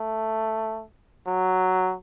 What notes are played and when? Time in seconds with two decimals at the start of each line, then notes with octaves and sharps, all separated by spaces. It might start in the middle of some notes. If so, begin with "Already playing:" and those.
Already playing: A3
1.27 F#3